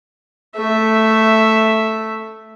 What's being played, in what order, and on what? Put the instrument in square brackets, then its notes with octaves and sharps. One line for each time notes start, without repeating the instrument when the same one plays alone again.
[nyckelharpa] A3 E5